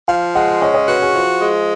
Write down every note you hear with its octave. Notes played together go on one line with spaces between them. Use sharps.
F3 F5
G#3 F#5
C#4 D#5
D#5
F#4 B4
G#4
F3
G#3